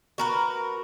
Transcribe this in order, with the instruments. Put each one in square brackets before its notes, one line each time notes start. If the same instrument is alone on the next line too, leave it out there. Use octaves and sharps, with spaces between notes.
[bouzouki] F#4 A#4 B4